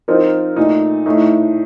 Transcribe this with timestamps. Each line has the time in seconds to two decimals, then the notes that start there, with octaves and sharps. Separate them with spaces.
0.08 F3 C4 D#4 A#4
0.56 A#2 A3 D#4
1.06 A2 A3 D#4